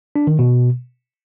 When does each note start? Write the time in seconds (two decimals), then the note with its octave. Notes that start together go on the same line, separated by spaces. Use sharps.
0.16 D4
0.27 D#3
0.39 B2